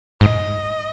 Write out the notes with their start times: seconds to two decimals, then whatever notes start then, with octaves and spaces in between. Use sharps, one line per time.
0.21 G#2 D#5